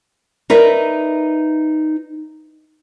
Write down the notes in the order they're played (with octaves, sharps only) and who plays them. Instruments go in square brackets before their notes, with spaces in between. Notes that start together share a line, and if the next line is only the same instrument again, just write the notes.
[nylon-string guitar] D#4 A#4 B4 D5 E5